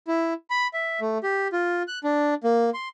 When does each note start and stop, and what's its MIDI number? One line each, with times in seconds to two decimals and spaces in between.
0.08 0.34 64
0.50 0.68 83
0.73 1.00 76
1.01 1.18 57
1.23 1.48 67
1.53 1.83 65
1.88 1.99 90
2.04 2.34 62
2.44 2.70 58
2.74 2.89 84